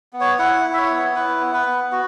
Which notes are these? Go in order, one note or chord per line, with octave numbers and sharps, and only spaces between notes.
B3
C#5
E4 F#5
E4
E5
C#5
B3
E4 B4
B3
B4
B3
F#4